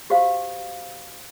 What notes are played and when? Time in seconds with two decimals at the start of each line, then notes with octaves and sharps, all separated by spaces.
0.10 F#4 G4 C5 F5